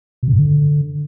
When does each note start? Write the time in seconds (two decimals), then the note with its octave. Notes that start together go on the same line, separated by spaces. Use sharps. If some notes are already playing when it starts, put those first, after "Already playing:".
0.23 B2
0.28 C#3
0.33 G2
0.38 D3